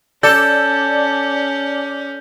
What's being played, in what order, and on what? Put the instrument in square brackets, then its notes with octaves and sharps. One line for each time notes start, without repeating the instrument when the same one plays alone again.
[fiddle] C#4 [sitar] A4 [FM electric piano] D5 D6 [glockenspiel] G6